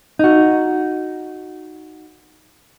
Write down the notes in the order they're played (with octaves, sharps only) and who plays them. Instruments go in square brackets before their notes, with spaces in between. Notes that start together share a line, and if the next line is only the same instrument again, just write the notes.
[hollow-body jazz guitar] D#4 F#4